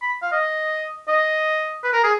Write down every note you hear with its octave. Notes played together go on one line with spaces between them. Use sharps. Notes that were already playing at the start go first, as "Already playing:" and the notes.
B5
F5
D#5
D#5
B4
A#4
G#4